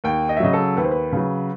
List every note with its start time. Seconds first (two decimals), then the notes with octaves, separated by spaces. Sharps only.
0.04 D#2 G5
0.29 D#5
0.37 E5
0.40 C#3 F#3 D#5
0.53 A4
0.76 D#2 B4
0.84 C5
0.91 B4
1.12 C#3 F#3